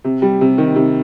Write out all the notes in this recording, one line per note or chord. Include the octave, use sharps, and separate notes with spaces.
C3
G3
C3
D#3
C3